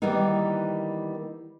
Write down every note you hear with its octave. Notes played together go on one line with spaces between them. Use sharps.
D#3 E3 G3 A#3 B3 D#4